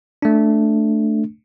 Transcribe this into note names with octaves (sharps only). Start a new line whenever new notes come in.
A3 D4